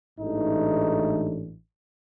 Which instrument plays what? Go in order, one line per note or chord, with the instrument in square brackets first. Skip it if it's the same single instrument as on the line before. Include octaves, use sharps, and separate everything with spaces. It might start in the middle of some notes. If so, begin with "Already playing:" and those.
[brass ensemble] A1 G#2 E3 A3 D4 D#4